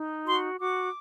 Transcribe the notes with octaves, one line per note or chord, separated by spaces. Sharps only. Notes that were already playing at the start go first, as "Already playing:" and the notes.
Already playing: D#4
F#4 C6
F#4 D6